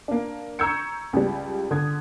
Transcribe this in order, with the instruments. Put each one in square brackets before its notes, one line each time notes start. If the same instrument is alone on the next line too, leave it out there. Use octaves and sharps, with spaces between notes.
[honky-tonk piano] A#3 D4
A#5 C#6 E6 G6 G#6 C#7
C#2 G3
D3 D#6 G#6